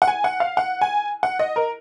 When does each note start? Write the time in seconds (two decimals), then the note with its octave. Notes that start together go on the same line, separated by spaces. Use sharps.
0.02 F#5
0.08 G#5
0.24 F#5
0.40 F5
0.57 F#5
0.81 G#5
1.23 F#5
1.39 D#5
1.56 A#4